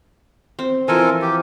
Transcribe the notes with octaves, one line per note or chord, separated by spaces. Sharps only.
C4
E3 F3 C4 A4 A#4 G#5
G4